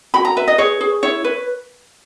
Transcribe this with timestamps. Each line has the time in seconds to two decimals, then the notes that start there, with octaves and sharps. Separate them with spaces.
0.14 F#4 B5
0.25 A#5
0.37 B4 E5
0.48 D#5
0.58 G#4 C#5
0.81 G#4
1.03 E4 C#5
1.24 B4